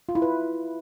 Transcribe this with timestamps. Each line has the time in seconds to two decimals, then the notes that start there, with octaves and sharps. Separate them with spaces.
0.09 F4
0.15 E4
0.22 B4